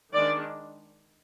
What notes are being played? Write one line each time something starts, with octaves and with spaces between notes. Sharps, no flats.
D#3 G#3 D4 D5